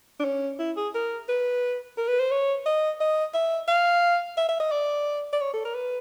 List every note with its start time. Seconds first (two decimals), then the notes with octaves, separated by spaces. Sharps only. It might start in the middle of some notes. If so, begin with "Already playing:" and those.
0.20 D4
0.25 C#4
0.59 E4
0.77 G#4
0.94 A#4
1.29 B4
1.98 A#4
2.08 B4
2.20 C5
2.31 C#5
2.66 D#5
3.01 D#5
3.34 E5
3.68 F5
4.37 E5
4.48 E5
4.60 D#5
4.71 D5
5.33 D5
5.41 C#5
5.54 A4
5.65 A#4
5.74 B4